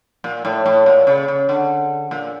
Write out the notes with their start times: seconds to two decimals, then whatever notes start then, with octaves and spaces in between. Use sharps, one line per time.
0.24 A#2
0.45 A2
0.66 A2
0.86 A#2
1.07 C#3
1.28 C#3
1.49 D3
2.11 A#2